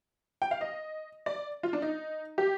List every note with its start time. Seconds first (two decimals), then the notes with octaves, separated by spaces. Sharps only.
0.42 G5
0.51 F5
0.61 D#5
1.26 D5
1.63 F4
1.73 D4
1.82 D#4
2.38 G4